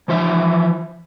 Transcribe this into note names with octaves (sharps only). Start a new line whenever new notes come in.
E3 F3 C5 E5